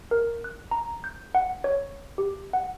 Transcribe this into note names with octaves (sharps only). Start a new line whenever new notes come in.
A#4
F#6
A#5
G6
F#5
C#5
G4
F#5